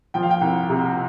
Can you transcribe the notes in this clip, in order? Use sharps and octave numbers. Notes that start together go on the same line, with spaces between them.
F3 G5
F5
G5
C2
C3